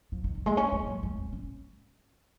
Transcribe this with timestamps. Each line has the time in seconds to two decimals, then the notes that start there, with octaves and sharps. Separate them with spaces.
0.12 F3
0.24 D#3
0.35 D#3
0.46 G#3
0.57 C#4
0.72 G#3
0.87 F#3
1.03 G#3
1.18 C4
1.32 C#4